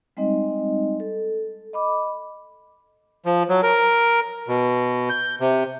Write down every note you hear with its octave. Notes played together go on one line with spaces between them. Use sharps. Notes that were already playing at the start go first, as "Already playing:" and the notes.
G3 G#3 C4 D#4 D#5
A4
D#5 B5 D6
F3
F#3
A#4
B2
G6
C3